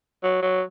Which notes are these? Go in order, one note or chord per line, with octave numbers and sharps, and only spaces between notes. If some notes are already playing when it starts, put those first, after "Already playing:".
F#3
F#3